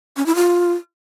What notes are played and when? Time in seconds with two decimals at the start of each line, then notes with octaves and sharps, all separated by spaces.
0.17 C#4
0.26 E4
0.35 F4